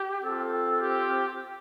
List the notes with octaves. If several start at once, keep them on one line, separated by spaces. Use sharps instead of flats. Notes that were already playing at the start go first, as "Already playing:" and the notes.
Already playing: G4
C4 F4 A4
G4